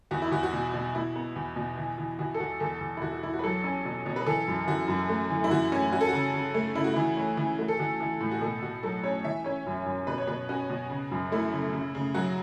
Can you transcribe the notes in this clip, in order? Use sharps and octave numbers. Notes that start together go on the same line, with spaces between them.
E2 F#4
E4
E2 F#4
F#4
B2
B2
B2 E4
B3
E2
B2
E3
E3
E3 F#4
A4
E2 F#4
E2 A4
E2
E4
E2 F#4
F#4
E2 E4
F#4
B4
F#3 A4
C#4
B2
B2
B4
E3 A4
F#2
E3 F#4
F#2
A3
E3
E4
E3 F#4
C#4
C#4 F#4
A4
C#3 F#4
C#3
A3
C#3 E4
F#4
E3 E4
C#4
E3
A3 F#4
A4
E3 F#4
E3
A2
F#4
B2 A4
B2 F#4
F#3 A4
C#4 C#5
E3 E5
C#4 C#5
F#2
F#2
B2 B4
C#5
B2 B4
C#4 F#4
B2
C#3
F#2
A3 E4
C#3
C#3
C#3
F#3 F#4